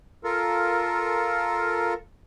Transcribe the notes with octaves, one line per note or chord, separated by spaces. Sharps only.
F4 A4 A#4